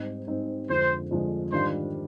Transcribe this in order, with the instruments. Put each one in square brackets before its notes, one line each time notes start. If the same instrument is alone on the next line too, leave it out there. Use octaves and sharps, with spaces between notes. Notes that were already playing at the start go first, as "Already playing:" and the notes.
Already playing: [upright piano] G#2 G3 C4 D#4
G#2 G3 C4 D#4
[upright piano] F2 D3 F3 G#3 D4 [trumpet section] C5
[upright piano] F2 D3 F3 G#3 D4
[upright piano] G#2 D#3 G3 D4 F4 [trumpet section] C5